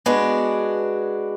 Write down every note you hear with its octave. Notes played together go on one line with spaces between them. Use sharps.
G#3 B3 D4 F#4